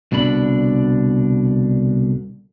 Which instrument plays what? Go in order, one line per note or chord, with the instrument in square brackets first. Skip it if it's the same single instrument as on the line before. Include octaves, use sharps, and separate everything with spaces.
[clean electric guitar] C2 B2 D3 D4 B5